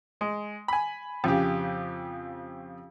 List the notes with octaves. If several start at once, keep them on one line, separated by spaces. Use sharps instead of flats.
G#3
G#5 B5
F2 C#3 G4